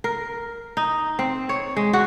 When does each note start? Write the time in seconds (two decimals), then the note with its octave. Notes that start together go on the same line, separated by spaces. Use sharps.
0.04 A#4
0.77 D#4
1.19 C4
1.49 C#5
1.76 G#3
1.93 F#4